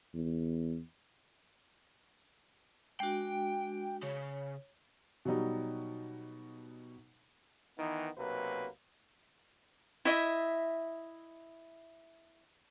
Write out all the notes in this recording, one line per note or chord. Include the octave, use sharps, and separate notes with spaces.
E2
G#3 D4 F#4 G5
C#3 C#5
B2 F#3 G3 D#4
D#3 E3 B3 D#4
B1 C3 F#3 A#3 B4
E4 D#5 E5